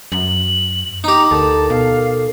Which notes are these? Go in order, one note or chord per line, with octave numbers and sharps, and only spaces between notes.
F#2 F#7
D#4 G4 A#5
D2 A4 A#4 A5
B2 F5